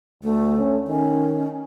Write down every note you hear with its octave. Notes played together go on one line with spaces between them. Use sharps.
D2 A3
C#4
D#3 C#4